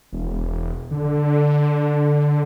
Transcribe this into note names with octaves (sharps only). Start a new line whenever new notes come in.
E1
D3